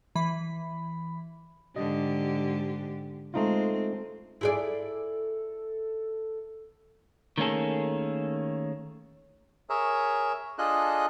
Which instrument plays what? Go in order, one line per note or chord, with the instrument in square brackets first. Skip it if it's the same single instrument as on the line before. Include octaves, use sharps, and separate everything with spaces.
[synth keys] E3 B5
[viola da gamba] G#2 D3 G4 [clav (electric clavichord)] D#5
[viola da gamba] G#3 C4 [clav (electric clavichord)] A3 D#4 F4
[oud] E4 G#4 D5 [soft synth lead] A4
[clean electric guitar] D#3 A3 A#3 C#4 G#4 A4
[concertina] G#4 A#4 C#5 E5
D4 F4 G#4 A4 D#5 F#6